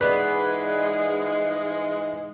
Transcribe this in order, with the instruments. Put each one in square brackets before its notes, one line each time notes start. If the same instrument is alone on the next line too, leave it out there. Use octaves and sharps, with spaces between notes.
[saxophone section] G#2 E3 G#3 [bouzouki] B3 D5 [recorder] G#4 [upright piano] B4